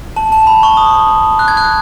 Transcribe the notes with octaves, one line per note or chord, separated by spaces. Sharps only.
A5
A5
B5
C#6
D#6
F#6
G#6
F#6